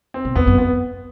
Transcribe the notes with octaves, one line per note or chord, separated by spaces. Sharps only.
C4
B2
E2 B3
F#2
B3